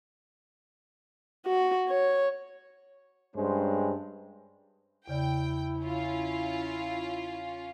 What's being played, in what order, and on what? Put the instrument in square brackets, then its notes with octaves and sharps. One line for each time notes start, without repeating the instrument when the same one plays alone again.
[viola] F#4
C#5
[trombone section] G2 G#3 C#4 C5
[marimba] E2 C#3 D5 [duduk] E4 [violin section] G5
[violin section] C#4 F4